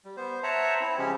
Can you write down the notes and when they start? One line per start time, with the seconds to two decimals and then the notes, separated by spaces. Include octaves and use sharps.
0.05 G3
0.17 B3 C5
0.43 C5 C#5 E5 F#5 A5 A#5
0.81 C4 E4
0.98 C#3 F3 G#3 C#4 G4